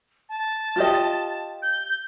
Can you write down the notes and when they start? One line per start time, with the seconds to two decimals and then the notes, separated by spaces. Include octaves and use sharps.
0.29 A5
0.76 F4 G4 D#5
1.62 G6